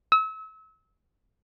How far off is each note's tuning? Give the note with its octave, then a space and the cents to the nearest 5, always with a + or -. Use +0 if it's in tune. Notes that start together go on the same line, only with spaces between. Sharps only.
E6 -35